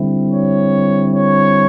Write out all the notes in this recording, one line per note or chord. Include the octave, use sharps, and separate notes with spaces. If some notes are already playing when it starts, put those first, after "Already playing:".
Already playing: D3 G3 C4 E4
C#5
C#5